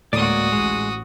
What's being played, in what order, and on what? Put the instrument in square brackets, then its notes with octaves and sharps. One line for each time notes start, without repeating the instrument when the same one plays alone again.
[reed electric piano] D2 A2 [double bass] G#3 [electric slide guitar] A#3 D5 [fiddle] F#4 D#6
[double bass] A1 [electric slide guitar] G#3